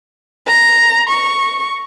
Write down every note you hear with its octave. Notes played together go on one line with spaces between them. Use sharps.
A#5
C#6